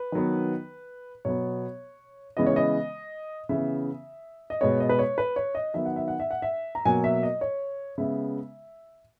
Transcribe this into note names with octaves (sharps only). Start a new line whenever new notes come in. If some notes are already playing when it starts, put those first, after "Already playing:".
Already playing: B4
D#3 F#3 B3
B2 F#3 B3 C#5
C#3 E3 G#3 B3 D#5
C#5
D#5
C#3 E3 B3 E5
D#5
B2 G#3 B3 C#5
D#5
B4
C#5
B4
C#5
D#5
D#3 F#3 B3 E5
F#5
E5
F#5
E5
F#5
E5
A#5
B2 F#3 A#3 G#5
E5
D#5
C#5
C#3 G#3 B3 E5